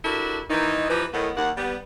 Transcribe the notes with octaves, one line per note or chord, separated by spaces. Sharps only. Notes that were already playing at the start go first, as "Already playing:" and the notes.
D4 E4 F#4 G4 A4 A#4
D#3 E3 A#3 D#4
E3 F3 D#4 G4 B4
A2 D#3 B3
D#2 A#3 F#5
G3 B3